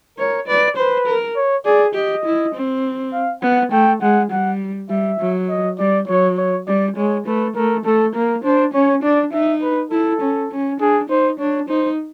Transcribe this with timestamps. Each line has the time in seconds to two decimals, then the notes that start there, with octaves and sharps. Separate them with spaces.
0.18 A#4 C#5
0.47 B4 D5
0.77 B4 C5
1.07 A#4
1.36 C#5
1.65 G#4 D5
1.94 G4 D#5
2.25 E4
2.55 C4
3.13 F5
3.42 B3 F#5
3.72 A3 G5
4.02 G#3 F#5
4.31 G3 F#5
4.90 G3 E5
5.20 F#3
5.49 D#5
5.79 G3 D5
6.08 F#3 C#5
6.38 C#5
6.67 G3 D5
6.96 G#3 C#5
7.26 A3 B4
7.55 A3 A#4
7.85 A3 A4
8.15 A#3 A#4
8.44 D4 C5
8.74 C#4 C#5
9.03 D4 D5
9.33 D#4 E5
9.62 B4
9.91 E4 A4
10.21 C#4
10.51 C#4
10.80 D4 G#4
11.09 D#4 C5
11.39 D4 C#5
11.68 D#4 C5